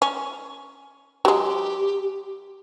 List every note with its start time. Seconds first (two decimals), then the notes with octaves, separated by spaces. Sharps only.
0.02 C#4
1.25 F#3 G#3 G4